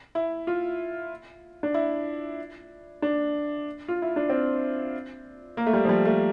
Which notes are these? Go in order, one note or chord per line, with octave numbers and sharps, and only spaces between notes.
E4
F4
D4
E4
D4
F4
E4
D4
C4
A#3
A3
G3
F3
G3
A3